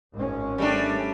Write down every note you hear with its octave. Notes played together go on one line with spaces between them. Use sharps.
G#1 G#3 C#4
G3 A3 D4